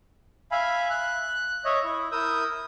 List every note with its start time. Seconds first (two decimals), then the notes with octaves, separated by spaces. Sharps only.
0.52 E5 F5 G#5 B5
0.90 F#6
1.65 C#5 D#5 E5
1.84 E4
2.12 E4 A#4 D#6 E6 G6